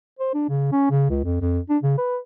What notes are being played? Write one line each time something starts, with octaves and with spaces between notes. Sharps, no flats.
C5
D4
C#3
C#4
C#3
C#2
F2
F2
D4
C#3
B4